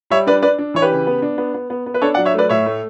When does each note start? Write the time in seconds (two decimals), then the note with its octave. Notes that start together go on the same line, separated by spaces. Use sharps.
0.10 G3 C#5 E5
0.27 D4 B4 D5
0.42 D4 B4 D5
0.59 D4
0.74 E3 C#5
0.82 G4 B4
0.91 C#3
1.07 B3
1.22 D4
1.38 B3
1.54 B3
1.70 B3
1.86 B3
1.94 B4
2.02 D4 A4 C#5
2.14 D5 F#5
2.18 F#3
2.25 C#5 E5
2.34 A3 B4 D5
2.49 A2 C#5 E5
2.66 A3